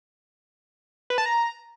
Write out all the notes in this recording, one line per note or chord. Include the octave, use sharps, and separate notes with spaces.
B4
A5
A#5